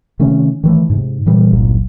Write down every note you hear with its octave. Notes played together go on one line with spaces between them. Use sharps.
C3 D#3 A3 C#4
D#3 E3 A3
G#2 C3
A#2 E3 G3
G1 C2 A#2 F#3